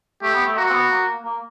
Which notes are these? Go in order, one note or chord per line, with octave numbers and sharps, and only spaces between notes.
A3 G4
B3
A3
A#3 F#4
C4
B3
A#3
A#3